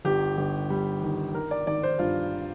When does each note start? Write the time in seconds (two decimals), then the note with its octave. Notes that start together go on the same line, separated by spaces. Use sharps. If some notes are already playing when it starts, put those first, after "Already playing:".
0.05 G1 G4
0.37 G1
0.70 G3
1.01 D#3
1.34 D#3 A#4
1.51 D5
1.67 G#1 D5
1.83 C5
1.99 G2 F4